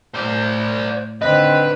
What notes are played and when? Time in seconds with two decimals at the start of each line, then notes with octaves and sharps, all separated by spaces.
0.15 A2 C5 D5
1.22 D3 D#3 C4 B4 D#5